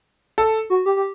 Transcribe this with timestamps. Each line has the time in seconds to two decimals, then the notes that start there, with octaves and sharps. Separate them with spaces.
0.38 A4
0.70 F#4
0.86 G4
0.96 G4